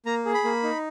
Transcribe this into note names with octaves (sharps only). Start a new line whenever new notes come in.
A#3 A#5
G#4
B5
A#3
D#4